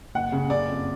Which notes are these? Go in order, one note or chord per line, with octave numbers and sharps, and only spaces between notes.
F#1 F#5
C#3
F#1 D5
F2